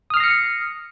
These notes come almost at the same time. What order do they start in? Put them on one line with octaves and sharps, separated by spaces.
D#6 F6 C7 A#6 C#7